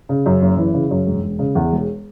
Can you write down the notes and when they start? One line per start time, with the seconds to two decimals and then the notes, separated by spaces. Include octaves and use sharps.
0.09 C#3
0.26 F#2
0.42 F#1
0.57 E3
0.74 C#3
0.91 F#2
1.06 E1
1.22 E1
1.39 C#3
1.55 E2
1.72 E1